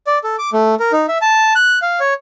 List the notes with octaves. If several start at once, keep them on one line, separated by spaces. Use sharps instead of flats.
D5
A4
D6
A3
A#4
D#4
E5
A5
F#6
F5
C#5